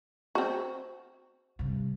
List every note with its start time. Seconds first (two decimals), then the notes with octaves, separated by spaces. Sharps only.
0.35 C4 F#4
1.59 G2 C3